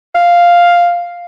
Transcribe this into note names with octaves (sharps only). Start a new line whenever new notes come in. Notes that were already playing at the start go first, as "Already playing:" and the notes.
F5